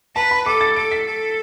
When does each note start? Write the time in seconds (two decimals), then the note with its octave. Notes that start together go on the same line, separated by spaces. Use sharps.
0.16 B4 A5
0.31 B5
0.46 A4 D6
0.61 A6
0.76 A4 D7
0.92 B6
1.06 A4